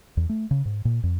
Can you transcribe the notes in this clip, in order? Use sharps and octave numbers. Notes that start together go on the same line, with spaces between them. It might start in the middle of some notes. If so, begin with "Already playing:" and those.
E2
A3
C#3
G#2
A#2
F2